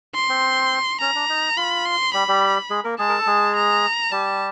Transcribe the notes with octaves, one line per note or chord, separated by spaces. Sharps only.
C6
C4
C#4 A#5
D4
D#4
F4 B5
C6
G3 G4 B5
G3 G4
G#3 G#4
A#3 A#4
G#3 G#4 A5
A#4
A4
G#3 G#4
A#5
G3 G4 A5